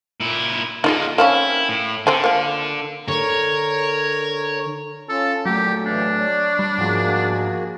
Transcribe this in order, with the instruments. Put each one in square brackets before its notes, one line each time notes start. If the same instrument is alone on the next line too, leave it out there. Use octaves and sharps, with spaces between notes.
[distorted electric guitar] A#2 E4
[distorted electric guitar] D3 A#3 [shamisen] D#4 F4 G#4
[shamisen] A#3 C4 C#4 [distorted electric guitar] E4
[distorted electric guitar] A2
[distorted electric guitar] D3 [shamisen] C4 C5 G#5
[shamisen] F3 A#3
[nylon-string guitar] D3 [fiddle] A#4 [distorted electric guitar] C#5
[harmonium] C#4 F4 A5 [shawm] A4
[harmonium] A#2 [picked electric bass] F#3 A3 [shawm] G4
[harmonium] A2 E3 F5 [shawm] D4
[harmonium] C#5 D5
[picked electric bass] G3
[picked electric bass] G#2 F3 [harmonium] A#3 F#4 G#4